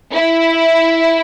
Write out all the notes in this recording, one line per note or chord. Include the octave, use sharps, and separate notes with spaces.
E4